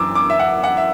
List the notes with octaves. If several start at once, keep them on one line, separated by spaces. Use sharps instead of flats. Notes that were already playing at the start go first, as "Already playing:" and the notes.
Already playing: F#2 E3 D6 E6
D6
E5
F#5
F#5
E5